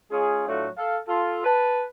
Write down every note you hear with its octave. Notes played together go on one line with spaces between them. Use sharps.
G#3 C#4 F4 G#4
A2 F#3 A3 D4 F4 F#4
A4 F5
F4 A4
B4 A5